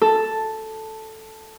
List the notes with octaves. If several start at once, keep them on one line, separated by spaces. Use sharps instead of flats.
A4